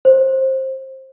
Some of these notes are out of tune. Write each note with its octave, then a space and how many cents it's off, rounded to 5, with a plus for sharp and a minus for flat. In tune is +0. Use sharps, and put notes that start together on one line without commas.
C5 +20